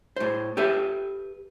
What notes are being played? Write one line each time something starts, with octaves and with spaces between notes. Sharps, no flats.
A2 C5
G4 A4 B4 E5